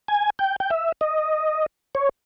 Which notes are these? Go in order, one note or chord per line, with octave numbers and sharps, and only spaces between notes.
G#5
G5
G5
E5
D#5
C#5